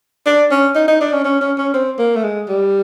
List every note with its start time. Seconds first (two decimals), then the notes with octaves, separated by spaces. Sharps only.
0.26 D4
0.51 C#4
0.75 D#4
0.88 D#4
1.01 D4
1.13 C#4
1.25 C#4
1.41 C#4
1.58 C#4
1.74 C4
1.99 A#3
2.16 A3
2.24 G#3
2.48 G3